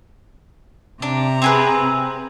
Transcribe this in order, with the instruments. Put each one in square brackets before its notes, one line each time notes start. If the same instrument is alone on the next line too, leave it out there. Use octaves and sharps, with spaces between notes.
[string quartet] C3 A#5 [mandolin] D4
[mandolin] C4 G#4 B4